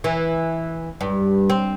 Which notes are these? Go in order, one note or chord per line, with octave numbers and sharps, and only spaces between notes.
E3
G2
C4